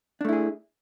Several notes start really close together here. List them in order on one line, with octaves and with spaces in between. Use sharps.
D4 A3 E4 G#4